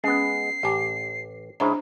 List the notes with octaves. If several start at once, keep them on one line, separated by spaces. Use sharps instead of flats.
G#3 B3 C#4 C7
A1 G4 D6
C#3 G#3 D4 E4 C5 A#5